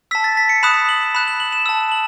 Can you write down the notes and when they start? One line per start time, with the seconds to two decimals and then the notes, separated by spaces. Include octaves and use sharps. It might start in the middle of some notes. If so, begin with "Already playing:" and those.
0.11 A5 E6 B6
0.24 A6
0.37 B6
0.49 C#7
0.63 B5 D#6 F#6 E7
0.89 F#7
1.14 B5 F#6 E7
1.28 F#7
1.40 F#7
1.52 E7
1.66 A5 E6
1.92 F#7